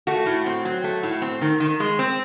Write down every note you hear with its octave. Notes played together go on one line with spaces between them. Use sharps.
A3 F#4
A2
C4
F#3
A3
A2
C4
D#3
D#3
G#3
C4